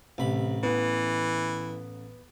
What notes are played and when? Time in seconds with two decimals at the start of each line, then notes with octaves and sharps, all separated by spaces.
0.18 A1 C3 B5
0.63 E3 B3